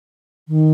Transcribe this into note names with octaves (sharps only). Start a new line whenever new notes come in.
D#3